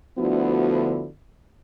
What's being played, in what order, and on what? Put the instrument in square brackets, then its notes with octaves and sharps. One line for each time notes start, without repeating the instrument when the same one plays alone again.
[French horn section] D2 D3 F3 B3 E4 F#4